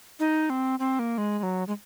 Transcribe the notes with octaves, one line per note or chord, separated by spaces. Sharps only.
D#4
C4
C4
A#3
G#3
G#3
F#3
G#3